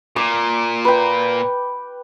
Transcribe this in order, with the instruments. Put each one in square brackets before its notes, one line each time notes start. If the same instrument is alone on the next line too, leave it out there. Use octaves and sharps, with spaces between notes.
[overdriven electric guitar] A#2 [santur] D6
[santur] B4 G5